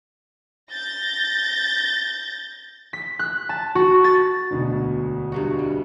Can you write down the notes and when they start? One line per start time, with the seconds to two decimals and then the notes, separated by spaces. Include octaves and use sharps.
0.71 G6 A6 A#6
2.93 B6
3.19 F#6
3.49 A5
3.75 F#4
4.04 A6
4.51 E1 D2 B2
5.32 G2 C3 F#4
5.59 G3